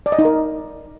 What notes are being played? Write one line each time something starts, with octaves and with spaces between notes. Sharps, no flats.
D5
D#5
D#4
A#4